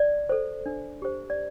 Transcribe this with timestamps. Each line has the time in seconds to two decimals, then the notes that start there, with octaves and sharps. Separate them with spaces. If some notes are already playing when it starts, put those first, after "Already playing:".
Already playing: D5
0.29 A4 C5
0.66 D4
1.02 G4 C5
1.30 D5